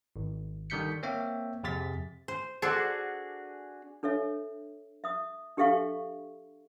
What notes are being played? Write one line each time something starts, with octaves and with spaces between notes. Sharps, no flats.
G#1
D3 D#3 G3 G6 B6 C#7
A#3 C4 C#5 E5 G5
F2 C3 G#4 A6 B6
C5
D4 F#4 G#4 A4 C5
D4 A4 C#5 E5
E5 D#6
D4 G4 A4 E5 F5 C#6